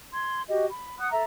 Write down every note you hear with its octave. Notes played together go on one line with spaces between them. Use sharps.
C6 G#6
F#4 G4 D#5
B5
F#5 D#6 F#6
A4 E5 A#5